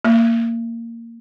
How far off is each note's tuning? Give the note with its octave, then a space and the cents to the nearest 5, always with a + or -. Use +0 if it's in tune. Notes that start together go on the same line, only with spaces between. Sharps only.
A#3 -15